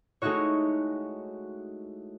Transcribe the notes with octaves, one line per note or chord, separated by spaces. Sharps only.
G#3 A3 D#4 E4 F#4 C#5